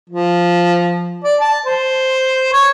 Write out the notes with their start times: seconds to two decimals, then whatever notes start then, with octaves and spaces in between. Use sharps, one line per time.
0.09 F3
1.24 D5
1.40 A5
1.66 C5
2.53 C#5